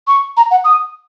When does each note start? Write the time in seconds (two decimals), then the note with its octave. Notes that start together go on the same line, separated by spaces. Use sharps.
0.07 C#6
0.37 A#5
0.51 F#5
0.65 D#6